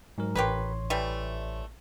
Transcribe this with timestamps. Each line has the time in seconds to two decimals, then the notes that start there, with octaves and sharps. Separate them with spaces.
0.18 G#2 F#3 A#4
0.35 A1 G4 A#4 B4 C#5 C6
0.90 E3 G3 A3